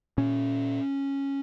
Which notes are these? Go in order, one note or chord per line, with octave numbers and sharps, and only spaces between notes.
A#2 C#4